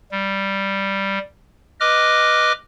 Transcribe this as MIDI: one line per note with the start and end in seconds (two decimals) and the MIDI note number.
0.12 1.19 55
1.80 2.52 71
1.80 2.52 75
1.80 2.52 86
1.80 2.52 89